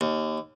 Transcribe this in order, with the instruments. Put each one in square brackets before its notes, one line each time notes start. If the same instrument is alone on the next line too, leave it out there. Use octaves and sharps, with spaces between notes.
[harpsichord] D#2